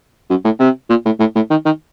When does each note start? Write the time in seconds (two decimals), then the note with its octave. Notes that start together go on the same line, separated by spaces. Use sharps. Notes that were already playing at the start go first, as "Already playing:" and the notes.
0.30 F#2
0.45 A2
0.60 C3
0.90 A#2
1.05 A2
1.20 A2
1.35 A2
1.50 D#3
1.66 D#3